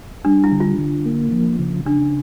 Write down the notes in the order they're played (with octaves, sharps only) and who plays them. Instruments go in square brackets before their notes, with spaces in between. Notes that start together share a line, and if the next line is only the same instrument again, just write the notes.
[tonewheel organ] G3 [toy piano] D4
[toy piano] E4
[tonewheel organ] D3
[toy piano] F4
[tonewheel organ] D3
A#3
F3
C#3
[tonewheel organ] C#3 [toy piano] D4